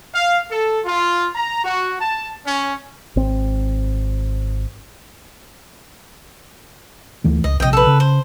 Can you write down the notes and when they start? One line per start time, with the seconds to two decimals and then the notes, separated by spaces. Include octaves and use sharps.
0.15 F5
0.51 A4
0.85 F4
1.36 A#5
1.65 F#4
2.01 A5
2.46 C#4
3.16 G#1 C4
7.24 D2 E3 A3
7.44 C#2 D#5
7.60 A#1 C3 D#5 G5
7.73 A4 B4
7.87 C#3
8.00 C5